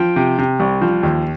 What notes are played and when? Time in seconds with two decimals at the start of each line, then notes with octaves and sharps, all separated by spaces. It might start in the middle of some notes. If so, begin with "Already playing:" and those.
Already playing: F3 G5
0.16 C3
0.38 C3
0.60 C2
0.81 F3
1.03 D#2